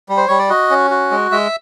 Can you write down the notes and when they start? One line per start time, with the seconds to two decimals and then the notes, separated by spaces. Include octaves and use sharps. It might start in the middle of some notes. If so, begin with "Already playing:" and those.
0.09 G3
0.17 C5
0.28 G3 C#5
0.39 D5
0.50 F#4 D#5
0.70 C#4
0.91 F#4
1.11 G#3
1.31 G#3 E5